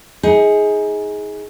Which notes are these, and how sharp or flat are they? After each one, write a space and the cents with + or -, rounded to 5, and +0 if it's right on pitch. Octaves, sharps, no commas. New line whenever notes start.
D#4 +30 G#4 +5